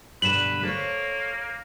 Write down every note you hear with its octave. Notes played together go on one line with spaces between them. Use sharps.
G2 B2 D3 B4 E7 F#7
A#3 A4 C5 C#5